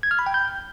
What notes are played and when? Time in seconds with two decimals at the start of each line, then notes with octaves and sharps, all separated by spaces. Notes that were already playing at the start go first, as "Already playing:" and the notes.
0.03 G#6
0.11 F6
0.19 B5
0.26 G5
0.34 G6